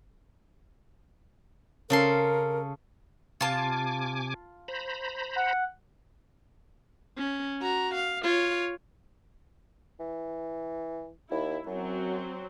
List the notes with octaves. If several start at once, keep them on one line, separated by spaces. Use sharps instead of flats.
C#3 A4 A#4 C6
C3 F4 G#5 A5 D6
C5 A#5 B5
F#5
C#4
F#4 A#5
F5
F4 C#5
E3
D#2 E4
F#2 F#3 C4